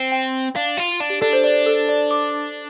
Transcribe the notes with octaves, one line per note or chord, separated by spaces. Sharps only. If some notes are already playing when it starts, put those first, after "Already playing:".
Already playing: C4
G5
D4 F5
F4
D4
G4
D4 A4
C5
D5
A4
D5
D6